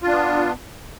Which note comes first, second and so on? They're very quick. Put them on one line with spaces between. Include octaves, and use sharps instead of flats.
F4 D4 B3